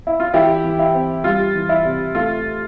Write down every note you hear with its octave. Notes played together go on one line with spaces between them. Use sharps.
E4
F4
E3 E4 G4
E3
E4
C4
G3 F4
E3
E4
C3
A3 F4